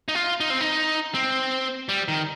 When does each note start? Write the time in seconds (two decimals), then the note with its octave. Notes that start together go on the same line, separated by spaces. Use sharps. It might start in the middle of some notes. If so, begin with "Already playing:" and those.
0.08 D#4
0.15 F4
0.40 D#4
0.50 C4
0.61 D#4
1.14 C4
1.89 G3
2.08 D#3